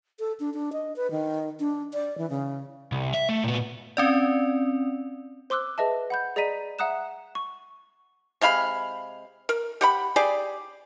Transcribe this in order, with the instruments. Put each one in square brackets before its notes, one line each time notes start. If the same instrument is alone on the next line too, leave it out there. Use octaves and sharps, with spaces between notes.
[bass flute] A4
D4
D4
D#5
B4
D#3
D4
D5
E3
C#3
[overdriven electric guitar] C2
E5
A3
A#2 B3
[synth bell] C4 C#4 D5
[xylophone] C5 C6 D6 E6 F#6
G#4 B4 D#5 E5 A5
F#5 B5 G6
G#4 D5 D#5 A#5 B6 D#7
E5 F#5 A#5 D#6 F#6 E7
C#6
[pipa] C3 G#3 F5 B5
A#4
G4 F#5 B5
G4 G#4 D5